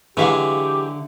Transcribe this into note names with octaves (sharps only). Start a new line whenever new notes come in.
D3 E3 F#3 G#3 G4 E5 F5